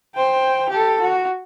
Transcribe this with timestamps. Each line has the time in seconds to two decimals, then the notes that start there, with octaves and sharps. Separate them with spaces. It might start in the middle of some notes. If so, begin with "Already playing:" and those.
0.15 C5 G5
0.70 G4 A4
1.01 F#4